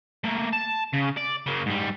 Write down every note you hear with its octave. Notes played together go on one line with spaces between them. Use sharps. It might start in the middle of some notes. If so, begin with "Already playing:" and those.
A3 A#3
A5
C#3
D5
C#3 A#3
G#2 G3